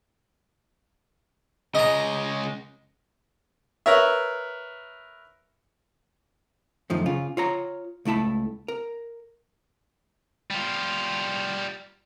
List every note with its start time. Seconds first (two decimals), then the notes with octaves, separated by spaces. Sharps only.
1.75 C#3 G#3 D#5 A#5
3.86 A#4 B4 C#5 E5
6.90 F#2 D#3 F3 A3
7.06 C#3 F4
7.37 F4 C#5 A#5
8.05 C#2 A3 E4 A5 B5
8.68 A#4
10.51 G3 F4